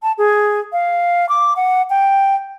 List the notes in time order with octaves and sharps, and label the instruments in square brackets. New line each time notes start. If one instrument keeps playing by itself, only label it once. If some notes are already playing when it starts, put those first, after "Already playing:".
[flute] A5
G#4
F5
D6
F#5
G5